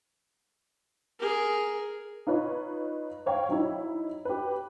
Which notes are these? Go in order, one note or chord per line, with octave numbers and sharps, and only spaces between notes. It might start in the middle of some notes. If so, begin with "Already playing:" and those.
G#4 A#4
D#4 F4 B4 C#5
C5 C#5 F5 G5
F#3 D#4 E4
G4 B4